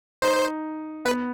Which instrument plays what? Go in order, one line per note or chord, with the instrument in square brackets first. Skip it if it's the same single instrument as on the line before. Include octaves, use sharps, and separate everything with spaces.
[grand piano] D#4 [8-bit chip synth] C5
[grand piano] B3 [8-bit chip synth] B4